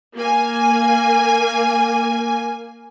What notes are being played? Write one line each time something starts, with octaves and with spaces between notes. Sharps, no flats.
A#3 G#5